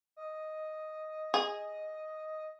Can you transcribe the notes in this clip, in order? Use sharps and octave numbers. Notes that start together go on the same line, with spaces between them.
D#5
G#4